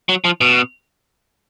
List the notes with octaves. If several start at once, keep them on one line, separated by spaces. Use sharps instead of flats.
F#3
F3
B2